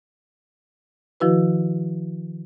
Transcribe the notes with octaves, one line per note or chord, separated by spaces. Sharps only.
D#3 F3 E4 F#4 B4